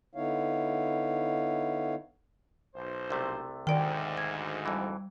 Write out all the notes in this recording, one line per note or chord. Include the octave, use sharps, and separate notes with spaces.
D3 B3 D#4 E4 C#5 F5
B1 C5
C2 C3 A3
D2 G#2 D#3 D5 G5
G#6
F2 E3 G3